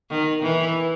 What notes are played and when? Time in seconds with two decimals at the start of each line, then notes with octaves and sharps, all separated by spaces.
0.10 D#3
0.43 E3